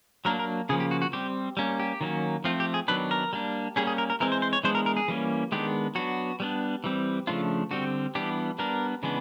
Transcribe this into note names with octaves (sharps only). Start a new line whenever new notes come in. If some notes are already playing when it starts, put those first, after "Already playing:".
F#3 A#3 D4 A#4
A#4
C#3 F3 A#3 G#4
G4
F#4
F#4
G3 C4 G4
G3 A#3 C#4
G4
D#3 F#3 A#3 C#4
F3 A3 C4 F4
G4
G#4
D#3 F#3 B3 D4 B4
A#4
G3 A#3 D4
G3 A#3 C#4 G#4
G#4
A#4
A#4
E3 G#3 C4 A#4
C5
C5
C#5
E3 G#3 B3 D4 C5
A#4
A#4
G#4
E3 G3 A#3 C#4
D#3 G#3 B3 D4 G4
F#3 B3 D4 F#4
G3 B3 D4
E3 G3 C4
C#3 F3 A3 D4 F4
D3 G3 C4 F#4
E3 G3 B3 D4 G4
G3 B3 D4 A#4
C#3 E3 G#3 B3 D4